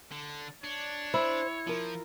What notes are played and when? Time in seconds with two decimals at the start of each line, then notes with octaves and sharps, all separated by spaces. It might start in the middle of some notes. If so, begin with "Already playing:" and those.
0.11 D3
0.64 D4 C#5
1.14 E4 C5
1.67 F3 F4 A#4